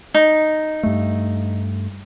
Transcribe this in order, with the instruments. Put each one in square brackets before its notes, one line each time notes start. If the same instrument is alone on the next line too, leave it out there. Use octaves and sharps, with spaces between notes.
[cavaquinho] D#4
[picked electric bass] G2 A3